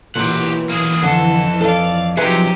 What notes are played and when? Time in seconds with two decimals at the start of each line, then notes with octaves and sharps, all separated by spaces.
0.15 B1 A#2 E3 G4 F#5
0.69 A#3 G#4
1.03 F2 D3 A4
1.61 A4 D5 F5
2.17 C3 F3 F#3 D#4 G4 G#4 B4 E5